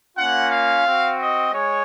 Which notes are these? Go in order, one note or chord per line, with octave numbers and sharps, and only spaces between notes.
A#3 C#4 F4 F#5
F5
C4 F#4
D#5
G#3 C#5